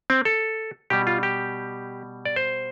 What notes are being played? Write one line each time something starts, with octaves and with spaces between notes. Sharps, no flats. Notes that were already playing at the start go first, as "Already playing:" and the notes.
C4
A4
B2 G3 G4
F4
G4
D5
C5